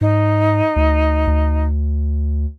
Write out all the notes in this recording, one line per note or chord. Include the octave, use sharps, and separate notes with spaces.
G#2 D#4
D2
D2